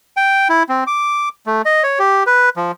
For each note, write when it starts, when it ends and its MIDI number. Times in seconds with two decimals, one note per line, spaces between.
0.17 0.48 79
0.50 0.63 64
0.69 0.84 60
0.87 1.29 86
1.46 1.62 57
1.65 1.83 75
1.83 1.99 73
1.99 2.23 67
2.27 2.49 71
2.56 2.72 53